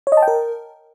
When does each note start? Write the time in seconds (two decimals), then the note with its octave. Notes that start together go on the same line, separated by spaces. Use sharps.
0.07 C#5
0.12 D#5
0.17 A5
0.22 G5
0.28 A#4